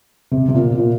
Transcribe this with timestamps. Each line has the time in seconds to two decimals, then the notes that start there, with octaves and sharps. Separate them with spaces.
0.32 C3
0.49 C3
0.54 A#2
0.78 A#2